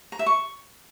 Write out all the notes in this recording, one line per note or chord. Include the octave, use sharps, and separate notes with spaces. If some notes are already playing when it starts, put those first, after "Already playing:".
A#5
E5
C#6